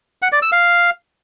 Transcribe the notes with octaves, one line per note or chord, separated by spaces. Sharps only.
F#5
D5
E6
F5